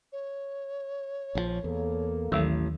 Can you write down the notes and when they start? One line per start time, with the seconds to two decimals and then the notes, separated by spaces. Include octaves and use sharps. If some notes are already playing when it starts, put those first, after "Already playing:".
0.12 C#5
1.35 A#1 C#3 F3
1.64 E2 A#3 A4
2.32 A1 D#2 D#3 F#3